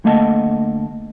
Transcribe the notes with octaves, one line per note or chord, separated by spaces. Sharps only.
D3 A3 A#3 D#5 F#5 A5